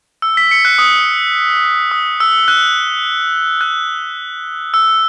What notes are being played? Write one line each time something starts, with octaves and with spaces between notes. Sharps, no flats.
E6
B6
C#7
F#6
D#6
D#6
E6
F#6
F#6
E6